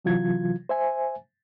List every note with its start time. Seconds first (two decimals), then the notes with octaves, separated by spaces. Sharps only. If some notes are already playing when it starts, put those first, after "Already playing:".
0.05 C3 E3 F#3 F4 G#6
0.69 C5 E5 G#5